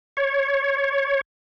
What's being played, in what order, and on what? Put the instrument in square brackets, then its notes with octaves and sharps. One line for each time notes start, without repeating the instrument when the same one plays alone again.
[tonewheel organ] C#5